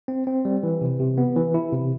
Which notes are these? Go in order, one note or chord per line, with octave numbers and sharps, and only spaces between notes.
C4
C4
G3
E3
C3
C3
B3
E3
E4
C3